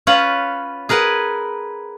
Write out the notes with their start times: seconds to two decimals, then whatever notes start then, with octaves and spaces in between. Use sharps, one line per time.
0.07 C#4 F4 B4 F#5
0.89 G#4 A#4 B4 F#5